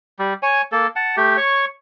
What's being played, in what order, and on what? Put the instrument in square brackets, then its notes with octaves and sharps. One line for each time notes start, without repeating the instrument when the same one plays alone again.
[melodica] G3
C#5 G#5
A#3 A4
F#5 A5
A3 G4
C#5 C#6